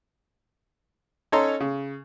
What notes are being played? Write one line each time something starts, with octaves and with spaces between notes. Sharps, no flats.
C#4 D#4 A4 C#5 A#5 C6
C#3